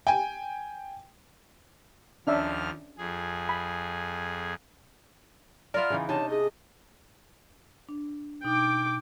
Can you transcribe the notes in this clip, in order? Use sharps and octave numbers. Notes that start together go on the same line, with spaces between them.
G5 G#5
D#2 F3 C#4 D4 E5 F6
F2 G#4
B5
B3 F4 A#4 D5 E5 F6
C#3 E3 D#4
C3 D4 D#4 C#5 A5
G#4 D#5
D4
B2 D#4 G5 D6